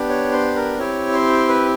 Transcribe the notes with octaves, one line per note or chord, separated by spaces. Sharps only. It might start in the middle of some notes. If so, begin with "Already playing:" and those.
Already playing: B3 D4 G4
C#5
C5
A#4
C4 E4 G4 C#5
C5
B4